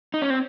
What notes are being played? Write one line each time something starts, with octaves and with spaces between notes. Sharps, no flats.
D#4
C#4
C4